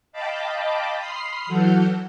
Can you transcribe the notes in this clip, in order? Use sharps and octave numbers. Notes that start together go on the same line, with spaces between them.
D#5 F5 G5 A5 B5 D6
B5 C6 D#6 F6 C7
E3 F#3 A4 F#5 F6 G6